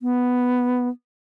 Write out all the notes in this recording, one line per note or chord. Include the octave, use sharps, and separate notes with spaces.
B3